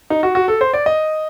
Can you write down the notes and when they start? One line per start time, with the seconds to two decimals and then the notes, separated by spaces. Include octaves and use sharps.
0.10 D#4
0.23 F#4
0.35 F#4
0.48 A4
0.61 C5
0.73 D5
0.86 D#5